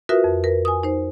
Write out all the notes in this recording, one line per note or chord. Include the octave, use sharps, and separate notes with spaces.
F4 F#4 A#4 B4 E5 D#6
F2
A#4 B4
G#5 D#6
D#4 C5